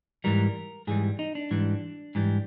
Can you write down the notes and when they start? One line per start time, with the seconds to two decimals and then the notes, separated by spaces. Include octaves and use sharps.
0.24 G#2 E3 G3 A#4
0.87 G#2 E3 G3 G#4
1.19 D#4
1.35 D4
1.51 G#2 E3 G3
2.15 G#2 E3 G3